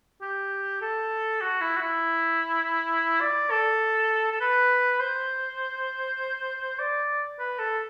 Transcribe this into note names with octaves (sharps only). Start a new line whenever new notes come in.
G4
A4
F#4
E4
F#4
E4
D5
A4
A4
B4
C5
D5
B4
A4